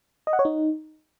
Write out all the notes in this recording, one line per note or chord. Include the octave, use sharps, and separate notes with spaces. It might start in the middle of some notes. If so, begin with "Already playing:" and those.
D#5
F#5
C#5
D#4